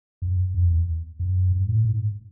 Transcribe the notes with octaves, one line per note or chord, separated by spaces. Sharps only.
F#2
F2
E2
F#2
G2
A2
G#2